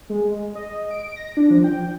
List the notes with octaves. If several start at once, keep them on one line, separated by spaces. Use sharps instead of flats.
G#3
G#3
D#5
D7
A#6
D4
F3
G5